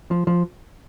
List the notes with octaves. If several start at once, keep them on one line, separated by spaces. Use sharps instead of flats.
F3
F3